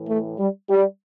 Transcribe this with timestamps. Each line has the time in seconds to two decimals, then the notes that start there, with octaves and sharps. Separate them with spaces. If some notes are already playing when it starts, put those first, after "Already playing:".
Already playing: A2 E3
0.08 A3
0.39 G3
0.69 G3